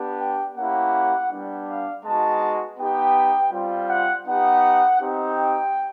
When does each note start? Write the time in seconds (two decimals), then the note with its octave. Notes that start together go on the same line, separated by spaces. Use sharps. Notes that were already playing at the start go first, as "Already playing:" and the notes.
Already playing: B3 D4 G4
0.19 G5
0.56 A#3 C#4 E4 G4 F#5
1.31 G3 B3 D4
1.67 F5
2.04 G#3 B3 D#4 F#4 A5
2.79 B3 D#4 G4 G5
3.52 G3 C4 F4
3.89 F#5
4.26 B3 D#4 G4 F#5
5.00 C4 D#4 G4
5.37 G5